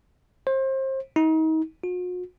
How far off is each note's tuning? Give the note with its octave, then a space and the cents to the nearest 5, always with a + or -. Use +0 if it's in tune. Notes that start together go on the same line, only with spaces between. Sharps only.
C5 +30
D#4 +35
F#4 -45